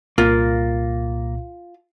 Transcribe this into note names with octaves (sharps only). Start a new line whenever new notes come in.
C2 A#2 A#3 F4